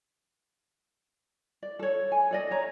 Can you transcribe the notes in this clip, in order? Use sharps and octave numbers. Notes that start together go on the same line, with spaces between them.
D5
A4 C#5
G#5
A4 D5 D#5
C#5 A#5